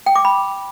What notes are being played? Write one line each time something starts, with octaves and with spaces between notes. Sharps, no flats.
G5
D6
B5